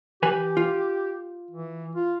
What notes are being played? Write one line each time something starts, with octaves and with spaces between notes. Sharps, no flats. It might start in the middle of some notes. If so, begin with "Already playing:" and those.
E3 G4 B4 G#5
F4
E3
F4